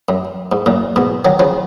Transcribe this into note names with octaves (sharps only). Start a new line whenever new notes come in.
F#2
G#2
F#2 A#2
G#2 B2
D#3 F#3
C#3 F3